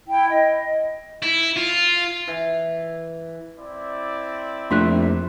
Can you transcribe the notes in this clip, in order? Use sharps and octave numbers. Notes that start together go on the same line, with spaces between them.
E4 G5
D#5
E4
F4
E3
C4 E4 D5
A#1 F2 A3 E5 C6 F#6